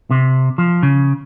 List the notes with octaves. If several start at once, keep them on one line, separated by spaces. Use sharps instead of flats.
C3
F3
C#3